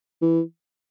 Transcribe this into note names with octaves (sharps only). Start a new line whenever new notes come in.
E3